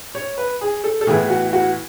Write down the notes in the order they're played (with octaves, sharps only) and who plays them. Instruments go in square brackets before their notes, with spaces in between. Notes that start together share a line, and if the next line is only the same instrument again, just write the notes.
[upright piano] C#5
B4
G#4
A4
A4
A2 E3 B3 E4 G#4
F#4
F#4